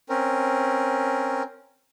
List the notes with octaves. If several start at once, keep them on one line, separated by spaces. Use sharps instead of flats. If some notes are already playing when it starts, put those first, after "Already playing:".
C4 C#4 A#4